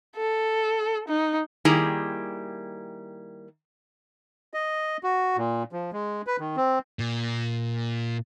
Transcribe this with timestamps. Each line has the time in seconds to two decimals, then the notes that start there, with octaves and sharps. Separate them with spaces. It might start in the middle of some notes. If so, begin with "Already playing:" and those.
0.17 A4
1.08 D#4
1.65 D#3 G3 A#3 E4 G#4 A#5
4.54 D#5
5.03 F#4
5.37 A#2
5.72 F3
5.93 G#3
6.27 B4
6.40 D#3
6.56 C4
6.99 A#2